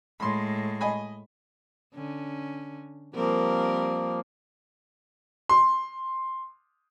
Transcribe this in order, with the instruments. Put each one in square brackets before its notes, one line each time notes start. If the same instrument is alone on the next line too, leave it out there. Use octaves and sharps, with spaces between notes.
[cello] A2 G#3 [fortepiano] B5 C6
[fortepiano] D#5 G#5 B5
[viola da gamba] D3 C#4
[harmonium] F3 A#3 [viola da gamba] G3 C4 A#4
[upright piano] C6